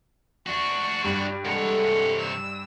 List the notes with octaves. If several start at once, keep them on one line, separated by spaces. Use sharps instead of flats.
D4 F#4 C#6
G2
C3 G#3 A4 C#5 F#5
E6